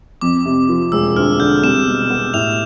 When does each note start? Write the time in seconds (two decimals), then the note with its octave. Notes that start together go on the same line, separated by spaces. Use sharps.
0.21 F2 D6
0.45 C3
0.69 F3
0.92 E1 E6
1.16 D2 F6
1.39 D3 G6
1.63 C2 E7
1.87 B2
2.10 B3
2.33 A2 F7